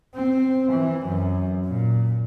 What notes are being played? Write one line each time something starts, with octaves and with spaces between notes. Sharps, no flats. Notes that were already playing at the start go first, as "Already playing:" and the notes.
C4
E3
F#2
A#2